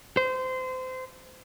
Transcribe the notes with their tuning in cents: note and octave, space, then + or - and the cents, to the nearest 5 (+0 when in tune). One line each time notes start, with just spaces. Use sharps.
C5 -25